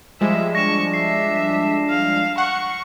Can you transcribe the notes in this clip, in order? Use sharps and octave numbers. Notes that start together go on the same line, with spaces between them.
F3 G3 G#3 E5
D4 D5 C#6 A#6 E7
E5 C7
F5
F#5 C#6